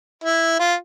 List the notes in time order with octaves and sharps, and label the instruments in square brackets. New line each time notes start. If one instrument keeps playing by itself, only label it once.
[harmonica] E4
F4